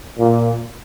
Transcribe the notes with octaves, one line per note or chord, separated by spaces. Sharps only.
A#2